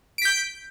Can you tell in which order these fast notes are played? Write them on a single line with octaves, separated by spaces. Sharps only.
D7 B6 G6